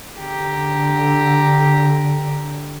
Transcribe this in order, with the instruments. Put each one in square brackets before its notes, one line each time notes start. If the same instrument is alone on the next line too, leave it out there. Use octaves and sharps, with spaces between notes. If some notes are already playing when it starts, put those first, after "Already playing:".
[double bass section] D3 [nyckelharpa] G4 A#5